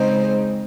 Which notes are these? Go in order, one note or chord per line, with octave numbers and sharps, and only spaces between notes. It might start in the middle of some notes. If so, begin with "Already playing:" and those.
Already playing: C#3 G#3 C4 D#4 C5